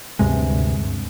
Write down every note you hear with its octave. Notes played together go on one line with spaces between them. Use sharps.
D2 G2 C3 G#3